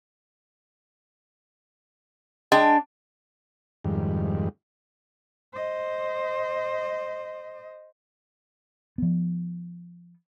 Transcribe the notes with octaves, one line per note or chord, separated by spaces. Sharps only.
G#3 D4 G5 G#5
F2 G#2 D#3 G3
C5 D#5
F3 B3